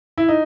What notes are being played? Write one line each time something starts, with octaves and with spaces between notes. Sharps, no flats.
E4
D#4